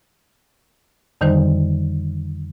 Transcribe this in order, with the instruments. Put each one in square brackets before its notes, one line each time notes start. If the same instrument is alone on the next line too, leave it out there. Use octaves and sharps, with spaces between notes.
[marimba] F2 D3 D#3 G3 D#4 C5